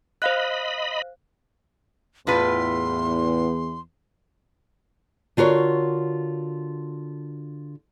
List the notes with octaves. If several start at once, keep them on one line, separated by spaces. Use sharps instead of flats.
C5 D#5 F5 B5 F#6
E2 A2 F4 B4 C6
D3 F4 F#4 A#4 C#5